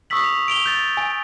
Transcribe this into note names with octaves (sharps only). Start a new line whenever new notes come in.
C#6 D#6 E6 B6 F#7
F7
D7 F7 G7
G6 A6
G#5